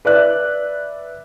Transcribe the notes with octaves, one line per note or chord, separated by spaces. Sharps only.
B4 D5 E5 F#6